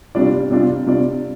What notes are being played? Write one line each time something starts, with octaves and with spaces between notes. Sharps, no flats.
C3 G3 D4 F4 D5
C3 G3 D4 F4 D5
C3 G3 D4 F4 D5